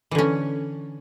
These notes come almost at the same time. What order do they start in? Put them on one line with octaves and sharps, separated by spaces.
E3 D3 C#4